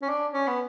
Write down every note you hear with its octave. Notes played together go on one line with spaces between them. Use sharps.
C#4
D4
C#4
B3